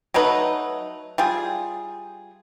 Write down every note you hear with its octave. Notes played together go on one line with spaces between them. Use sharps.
F#3 A3 D#4 B4
G3 F4 G#4